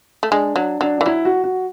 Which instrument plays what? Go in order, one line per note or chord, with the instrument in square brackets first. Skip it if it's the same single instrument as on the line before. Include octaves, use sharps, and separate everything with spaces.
[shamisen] A3
[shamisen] G#3 [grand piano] D4
[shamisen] F#3 [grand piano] D4
[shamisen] F#3 [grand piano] D4
[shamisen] E3 [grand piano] D4
[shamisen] F#3 [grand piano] E4
[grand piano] F#4
F#4